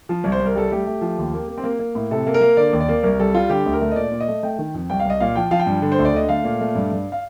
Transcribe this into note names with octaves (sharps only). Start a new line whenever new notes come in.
F3
C2
C5
C2
A#4
G3 A4
A3 G4
A3
F3
D#2
A#3
A#3
C4
A#3
A#3
A2
C3 A4
A#3
A#4
A#3
D3 D5
D#2
D5
A#3
C2 A#4
G3 A4
G3 F4
D3 G4
D2
A#4
A3
D#5
A#2 D5
A#2
D#5
A3
A3 G5
D#3
F2
C2 G5
F5
C2 D#5
A#2 F5
F3 G5
F3 F5
G5
G2
D3
C5
D2
D5
D3 D#5
A3 F5
A#2
A3
G2
G2
F5